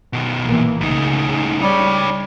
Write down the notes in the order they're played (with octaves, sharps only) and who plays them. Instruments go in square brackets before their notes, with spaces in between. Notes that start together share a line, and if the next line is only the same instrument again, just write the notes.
[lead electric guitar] B2 D#3
[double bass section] A#1 E3 A#3
[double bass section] C#2 C#3 [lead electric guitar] A2 D#4
[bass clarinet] G3 [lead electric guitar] D#4 C#5